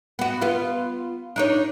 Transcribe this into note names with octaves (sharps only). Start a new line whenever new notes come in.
B3 F#4
B3 F4
D4 D#4 C#5